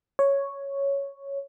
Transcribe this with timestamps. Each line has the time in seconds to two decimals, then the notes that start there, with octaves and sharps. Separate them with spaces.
0.19 C#5